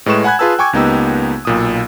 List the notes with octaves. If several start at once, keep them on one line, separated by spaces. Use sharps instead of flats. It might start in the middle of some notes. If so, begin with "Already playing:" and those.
A2 G#3 B4 C#6 E7
F#5 G#5 B5 F#6 G#6
F4 G#4 B4 A5 E6
G5 G#5 C#6 D6 G#6
C#2 A#3 B3 D#4 G4 E6
B1 A#2 D#6